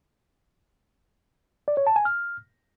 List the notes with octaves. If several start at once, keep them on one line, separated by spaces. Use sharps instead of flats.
D5
C#5
A5
G#5
F6